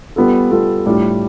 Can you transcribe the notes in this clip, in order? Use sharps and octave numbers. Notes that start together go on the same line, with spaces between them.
G3 B3 F4 A4
G3 B3 F4 A4
A2 G3 D4 F4